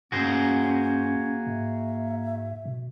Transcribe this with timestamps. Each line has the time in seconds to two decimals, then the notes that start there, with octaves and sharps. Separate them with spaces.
0.12 G2 A#3 C#4 F#4 G#4 C5
1.46 G#2 E5
2.65 B2